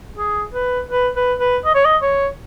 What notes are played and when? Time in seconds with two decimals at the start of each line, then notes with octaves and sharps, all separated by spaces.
0.18 G#4
0.54 B4
0.91 B4
1.16 B4
1.40 B4
1.65 D#5
1.75 C#5
1.85 D#5
2.02 C#5